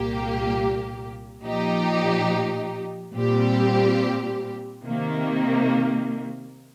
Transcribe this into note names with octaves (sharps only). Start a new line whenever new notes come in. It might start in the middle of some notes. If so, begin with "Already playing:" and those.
Already playing: C2 A#2 A#3 G4
A#2 F3 D#4 G4
A#2 G3 C4 G4
C3 D#3 A#3